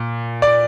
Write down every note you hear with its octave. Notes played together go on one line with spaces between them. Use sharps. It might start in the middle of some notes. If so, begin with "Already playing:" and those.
Already playing: A#2
D5